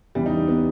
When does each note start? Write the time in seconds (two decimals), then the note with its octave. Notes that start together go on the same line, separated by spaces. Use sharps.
0.15 E2 C#3 E3 G3
0.26 D#4
0.48 B3